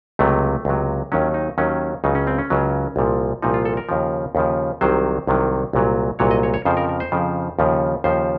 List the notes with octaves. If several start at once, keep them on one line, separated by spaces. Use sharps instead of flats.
C#2 C3 F#3 A3
C#2 C3 F#3
D#2 D#3 F#3 C#4
D#4
D#2 D#3 F#3 C#4
C#2 C#3 F#3 D#4
C#4
C4
C#4
C#2 C#3 F#3
C2 A#2 F3
C2 A#2 F3 D#4
F4
A4
A#4
D#2 C#3 F3
D#2 C#3 F3
C2 C3 D#3 F#3 C5
C2 C3 D#3 F#3
C2 A#2 F#3
C2 A#2 F#3 C#5
D#5
C#5
C#5
F2 C#3 F3 C5
A#4
A#4
C5
F2 C#3 F3
D#2 C#3 F3
D#2 C#3 F3 C5